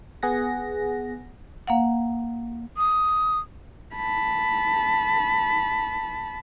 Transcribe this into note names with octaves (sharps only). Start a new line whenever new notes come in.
B3 G#4 F#5 A#6
A#3 F5 F#5
D#6
A5 B5